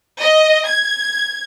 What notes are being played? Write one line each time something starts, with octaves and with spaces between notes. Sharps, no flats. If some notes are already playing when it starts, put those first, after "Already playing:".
D#5
G#6